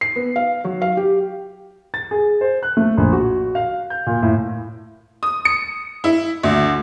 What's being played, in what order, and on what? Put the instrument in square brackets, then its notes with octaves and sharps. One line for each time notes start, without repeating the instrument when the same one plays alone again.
[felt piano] C7
B3
F5
F#3
F5
G4
[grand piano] A6
G#4
C5
F#6
A3
A#1
F#4
F5
G6
A#2
A2
[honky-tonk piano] D#6
C#7
E4
D2